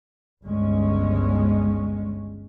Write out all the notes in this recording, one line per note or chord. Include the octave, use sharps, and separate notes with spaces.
G1 C#2 G#3 C#4